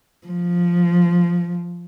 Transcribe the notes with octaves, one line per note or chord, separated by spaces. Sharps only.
F3